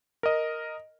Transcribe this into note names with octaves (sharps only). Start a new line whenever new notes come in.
A#4 D#5